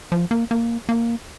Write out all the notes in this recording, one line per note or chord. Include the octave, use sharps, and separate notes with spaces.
F3
A#3
A#3
A#3